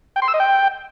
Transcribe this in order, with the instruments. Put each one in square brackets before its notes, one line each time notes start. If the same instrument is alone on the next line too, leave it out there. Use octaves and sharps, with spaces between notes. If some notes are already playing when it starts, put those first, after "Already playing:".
[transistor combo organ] G5
C6
E6
D#5
G5